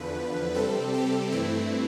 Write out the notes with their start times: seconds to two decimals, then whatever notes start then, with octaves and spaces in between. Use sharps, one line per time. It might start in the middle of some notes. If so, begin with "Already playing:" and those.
Already playing: E2 D3 F3 B4
0.55 C3 G3 C4 A4
0.94 G4
1.32 G2 E3 A3 C4 E4